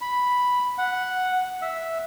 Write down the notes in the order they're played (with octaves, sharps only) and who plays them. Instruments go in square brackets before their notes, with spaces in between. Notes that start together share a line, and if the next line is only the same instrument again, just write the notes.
[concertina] B5
F#5
E5